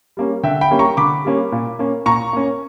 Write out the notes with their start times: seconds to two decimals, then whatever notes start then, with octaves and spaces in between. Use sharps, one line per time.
0.17 G3 A#3 C#4
0.43 D3 E5 G5
0.61 G5 B5
0.70 G3 A#3 C#4
0.79 A#5 C#6
0.97 D3 B5 D6
1.25 G3 A#3 C#4
1.52 A#2
1.79 A#3 C#4
2.06 A#2 A#5 C#6
2.33 A#3 C#4